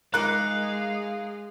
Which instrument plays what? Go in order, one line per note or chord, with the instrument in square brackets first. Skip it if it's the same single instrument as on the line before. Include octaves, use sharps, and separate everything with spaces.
[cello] G#3 G#4 [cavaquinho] D#4 A#4 D6 [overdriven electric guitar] F5 [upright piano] F#6